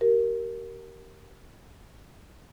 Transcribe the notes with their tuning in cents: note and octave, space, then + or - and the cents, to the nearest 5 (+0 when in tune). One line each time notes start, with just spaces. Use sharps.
G4 -35 A#4 +0